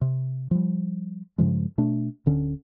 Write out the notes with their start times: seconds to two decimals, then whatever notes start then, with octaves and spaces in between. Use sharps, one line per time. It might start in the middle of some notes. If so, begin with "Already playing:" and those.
0.01 C3
0.51 F3 G3
1.38 G2 C#3 F3 G#3
1.78 B2 A3 D4
2.26 D1 D3 C#4